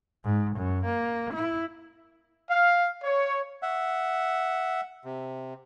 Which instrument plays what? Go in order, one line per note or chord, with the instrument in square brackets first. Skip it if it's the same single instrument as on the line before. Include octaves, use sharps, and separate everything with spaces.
[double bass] G#2
F#2
A#3
E4
[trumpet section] F5
C#5
[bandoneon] E5 F#5
C3